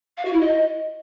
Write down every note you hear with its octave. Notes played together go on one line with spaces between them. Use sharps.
F5
F#4
E4
D#5